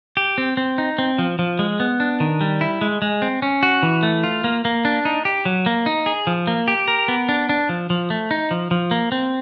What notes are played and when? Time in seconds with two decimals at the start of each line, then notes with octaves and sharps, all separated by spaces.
0.17 G4
0.38 C4
0.57 C4
0.78 D#4
0.98 C4
1.19 F3
1.39 F3
1.59 G#3
1.80 B3
2.00 D4
2.20 D#3
2.41 G3
2.61 E4
2.81 G#3
3.02 G#3
3.22 C4
3.42 C#4
3.63 F#4
3.83 E3
4.03 A3
4.23 F4
4.44 A#3
4.65 A#3
4.85 D4
5.05 D#4
5.25 G4
5.45 F#3
5.66 A#3
5.86 D#4
6.06 G#4
6.27 F3
6.47 A#3
6.68 G4
6.88 A#4
7.08 B3
7.29 D4
7.49 D4
7.69 F3
7.90 F3
8.10 A3
8.31 D#4
8.51 F3
8.71 F3
8.91 A#3
9.12 C4